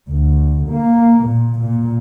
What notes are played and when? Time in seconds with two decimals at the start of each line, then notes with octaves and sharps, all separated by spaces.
0.11 D2
0.74 A#3
1.27 A#2
1.63 A#2